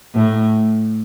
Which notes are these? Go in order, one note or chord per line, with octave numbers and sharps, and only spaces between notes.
A2